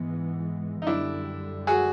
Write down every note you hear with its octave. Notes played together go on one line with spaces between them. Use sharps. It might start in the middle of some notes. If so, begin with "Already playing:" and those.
Already playing: G#2 E3 G#3 B3
D#4
F#2 D3 G3 D4 E4
F#4 G#4